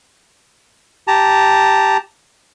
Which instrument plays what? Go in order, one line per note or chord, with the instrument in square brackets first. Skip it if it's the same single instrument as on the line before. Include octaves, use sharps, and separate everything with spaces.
[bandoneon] G4 A5 A#5